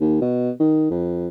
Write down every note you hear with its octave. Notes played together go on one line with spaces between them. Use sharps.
D#2
B2
D#3
F2